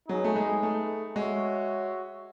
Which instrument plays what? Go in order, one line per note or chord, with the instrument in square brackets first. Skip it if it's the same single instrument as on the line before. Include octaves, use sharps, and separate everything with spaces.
[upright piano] F#3 [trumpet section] D#4 G#4 B4
[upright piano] A3
G#3
A3
[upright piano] G#3 [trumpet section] F#4 C#5 E5